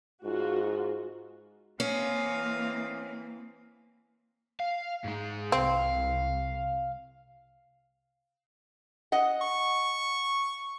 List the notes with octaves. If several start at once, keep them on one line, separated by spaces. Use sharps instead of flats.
G#2 F4 F#4
E3 A#3 C4 C#4 D#5 F5
F5
G#2 G#3
C2 C4 F5
D#5 F#5
C#6